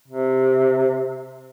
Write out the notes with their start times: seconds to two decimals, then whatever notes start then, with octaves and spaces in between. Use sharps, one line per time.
0.08 C3